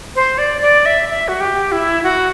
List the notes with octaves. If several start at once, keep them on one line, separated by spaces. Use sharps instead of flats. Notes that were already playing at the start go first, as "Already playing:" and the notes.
C5
D5
D5
E5
E5
F#4
G4
E4
F#4